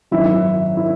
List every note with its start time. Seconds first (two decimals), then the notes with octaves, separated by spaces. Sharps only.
0.11 G#1 F#2 D#3 E4
0.77 E4